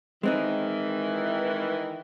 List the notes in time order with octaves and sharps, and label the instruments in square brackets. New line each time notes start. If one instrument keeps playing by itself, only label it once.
[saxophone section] D#3 E3 [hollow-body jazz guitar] G#3 C4 D#4